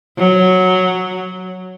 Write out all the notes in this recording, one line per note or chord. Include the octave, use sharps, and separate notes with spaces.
F#3